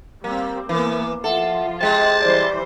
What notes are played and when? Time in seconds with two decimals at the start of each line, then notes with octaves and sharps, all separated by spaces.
0.24 G3 A#3 C4
0.69 E3 A#3 B3
1.24 F3 F4 A4 E5 F#5
1.81 C3 G#3 G5 A5 C6
2.21 E3 G3 C5 D5